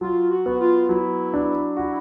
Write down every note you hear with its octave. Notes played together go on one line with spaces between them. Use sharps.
F#3 F4
F#4
B3
F4
F#3 E4
D4
E4 F#4